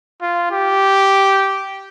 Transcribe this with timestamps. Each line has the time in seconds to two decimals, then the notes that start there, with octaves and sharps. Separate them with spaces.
0.22 F4
0.52 G4